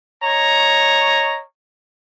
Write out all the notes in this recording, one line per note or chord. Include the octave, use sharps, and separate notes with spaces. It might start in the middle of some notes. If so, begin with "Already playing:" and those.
C#5 D#5 A#5